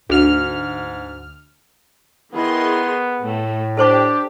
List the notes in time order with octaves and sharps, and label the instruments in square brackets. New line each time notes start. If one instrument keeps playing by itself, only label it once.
[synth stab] D2 F6 [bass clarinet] G#2
[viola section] D#3 G#4 C6 [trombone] B3 [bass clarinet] E4
[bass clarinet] A2 [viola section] A3
[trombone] D4 [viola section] G4 [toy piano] A4 C5 C#6